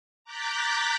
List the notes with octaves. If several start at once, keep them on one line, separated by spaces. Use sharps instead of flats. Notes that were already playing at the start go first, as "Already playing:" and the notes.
A#5 D6 F#6 G6 A6 B6